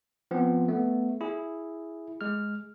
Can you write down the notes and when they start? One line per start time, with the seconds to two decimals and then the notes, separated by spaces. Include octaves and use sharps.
0.31 F3 B3 C4
0.68 A3 B3
1.21 E4 G#4
2.21 G#3 F6